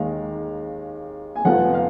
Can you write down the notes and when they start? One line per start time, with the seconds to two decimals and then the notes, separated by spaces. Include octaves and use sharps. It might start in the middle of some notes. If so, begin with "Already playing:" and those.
Already playing: D#2 D#3 G#3 F5
1.36 G#5
1.44 F1 F2 F3 B3 F4 F#5
1.74 F5